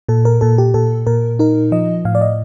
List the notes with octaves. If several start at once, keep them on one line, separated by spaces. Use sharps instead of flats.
A#2 A4
A#4
A#2 A4
G4
A#2 A4
A#2 A#4
D#4 A#4
F3 D#5
A2 F5
D5
D#5